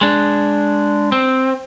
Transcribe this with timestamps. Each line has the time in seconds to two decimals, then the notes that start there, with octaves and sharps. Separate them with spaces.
0.01 G#3 D4
1.12 C4